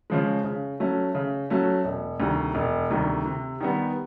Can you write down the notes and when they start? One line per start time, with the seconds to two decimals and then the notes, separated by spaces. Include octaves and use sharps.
0.10 C#3 F3 G#3
0.44 C#3
0.80 F#3 A3 C#4
1.15 C#3
1.50 F#3 A3 C#4
1.84 E1
2.20 D2 C3 D#3 G3
2.55 E1
2.90 D2 C3 D#3 G3
3.26 C3
3.60 D#3 G3 B3